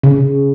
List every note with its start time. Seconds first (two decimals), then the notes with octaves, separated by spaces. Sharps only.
0.04 C#3